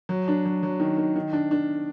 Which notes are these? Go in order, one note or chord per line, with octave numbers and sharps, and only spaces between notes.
F#3
D4
F#3
F#3
D#3
D#3
D#3
D4
D4